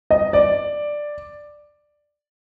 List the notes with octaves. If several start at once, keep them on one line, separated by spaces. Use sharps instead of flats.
D#5
D5